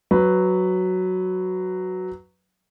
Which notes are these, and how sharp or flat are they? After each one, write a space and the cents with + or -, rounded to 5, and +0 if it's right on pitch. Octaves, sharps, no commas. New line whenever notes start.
F#3 +0 B4 +5